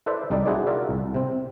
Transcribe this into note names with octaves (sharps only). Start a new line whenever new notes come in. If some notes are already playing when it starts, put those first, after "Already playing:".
E4 A4 B4 C5 D5 E5
C2 G3 D#4 A4 D5
D4 E4 F#4 G#4 C5 D5
F4 F#4 A#4 D5 E5
C2
C3 C4